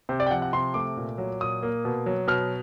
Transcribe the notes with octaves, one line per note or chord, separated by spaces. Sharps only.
C3 C5
D5
G5
F3 F#5
F#5
C3 C6
A3 D6
A#2
F#3
A#2 D#6
A#3
B2
F#3
B2 F6